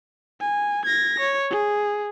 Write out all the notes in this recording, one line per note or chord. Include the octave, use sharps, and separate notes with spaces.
G#5
G#6 A#6
C#5
G#4